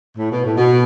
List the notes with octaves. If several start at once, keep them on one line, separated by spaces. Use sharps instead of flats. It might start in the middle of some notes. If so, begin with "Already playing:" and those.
A2
B2
A2
B2